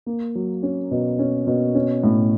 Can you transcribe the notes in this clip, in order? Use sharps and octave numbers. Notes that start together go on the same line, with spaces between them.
A#3
F#3
C#4
B2
C#4
B2
C#4
A2